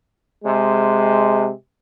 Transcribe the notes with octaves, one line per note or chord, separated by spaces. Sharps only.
C3 G#3